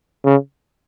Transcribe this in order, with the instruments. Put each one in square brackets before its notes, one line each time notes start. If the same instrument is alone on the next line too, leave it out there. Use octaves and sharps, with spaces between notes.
[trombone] C#3